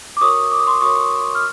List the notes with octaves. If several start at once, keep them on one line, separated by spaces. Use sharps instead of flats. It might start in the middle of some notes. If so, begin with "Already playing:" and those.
D6
F#4 A#4 C#5 C#6 D#6
D6
D#6
C6 D6
F#4 A#4 C#5 C#6 D#6
F6